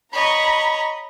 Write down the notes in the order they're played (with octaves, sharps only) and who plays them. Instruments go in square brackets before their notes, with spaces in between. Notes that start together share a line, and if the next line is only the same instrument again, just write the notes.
[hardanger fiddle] C#5 D#5 [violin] A#5 B5